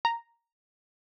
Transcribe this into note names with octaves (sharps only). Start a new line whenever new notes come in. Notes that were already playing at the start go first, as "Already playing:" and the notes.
A#5